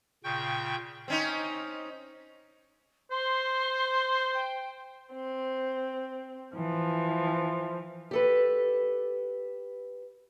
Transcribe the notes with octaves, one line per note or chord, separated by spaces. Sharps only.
A#2 C#3 G5 C#6 G6
C4 C#4 D#4
C5 C6
G5
C4
E3 F3
G4 A4 B4